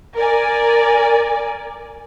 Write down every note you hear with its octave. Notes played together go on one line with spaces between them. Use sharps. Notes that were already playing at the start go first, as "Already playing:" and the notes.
A#4 D5 G#5